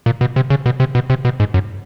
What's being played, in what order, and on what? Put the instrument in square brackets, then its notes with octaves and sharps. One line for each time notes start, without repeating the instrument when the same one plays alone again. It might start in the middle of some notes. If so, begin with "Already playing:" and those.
[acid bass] A#2
B2
C3
C#3
B2
C3
B2
C3
B2
G#2
F#2